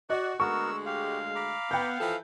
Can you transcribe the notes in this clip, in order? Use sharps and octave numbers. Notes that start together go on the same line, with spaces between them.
F#4 D5 D#5
D2 G#3 B3 F#4 A#4 C#6 E6
G4 F5
A#5 B5 D6
B3 G5 G6
E3 F3 A4